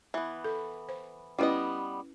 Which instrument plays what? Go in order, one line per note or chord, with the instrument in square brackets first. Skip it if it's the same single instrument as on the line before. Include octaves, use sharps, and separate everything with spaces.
[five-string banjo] E3 B3
[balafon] A4
C5
[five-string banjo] G3 B3 D#5 [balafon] C#4 E4 B4